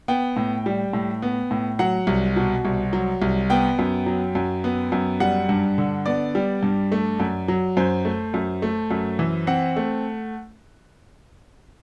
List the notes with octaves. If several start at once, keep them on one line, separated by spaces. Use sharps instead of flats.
B3 G5
A2
G3
A2
B3
A2
F#3 F#5
C2
B2
C2
F#3
C2
B3 G5
F#2
F#3
F#2
B3
F#2
G3 F#5
G2
D3
B3 D5
G3
G2
A3
F#2
F#3
F#2 C5
A3
F#2
A3
F#2
E3
C4 F#5
A3